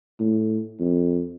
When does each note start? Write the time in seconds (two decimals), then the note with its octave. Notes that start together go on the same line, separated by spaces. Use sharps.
0.20 A2
0.80 F2